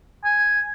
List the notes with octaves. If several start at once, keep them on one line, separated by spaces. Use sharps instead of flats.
G#5